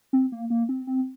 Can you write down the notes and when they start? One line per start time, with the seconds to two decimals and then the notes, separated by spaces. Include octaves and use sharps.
0.13 C4
0.32 A#3
0.50 A#3
0.69 C4
0.87 C4